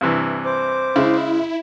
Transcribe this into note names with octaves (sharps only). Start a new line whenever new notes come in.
G2 C3 E3
C5 D6
C#3 G#3 E4